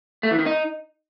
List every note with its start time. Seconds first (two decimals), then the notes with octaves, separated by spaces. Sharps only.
0.23 A3
0.31 E3
0.39 D#3
0.46 D#4